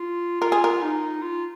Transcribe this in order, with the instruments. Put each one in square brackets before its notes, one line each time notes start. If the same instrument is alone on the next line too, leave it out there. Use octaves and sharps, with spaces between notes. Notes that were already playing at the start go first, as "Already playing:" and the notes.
Already playing: [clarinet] F4
[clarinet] F4 [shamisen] A#4
[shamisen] G#4
A#4
[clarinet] D#4
F4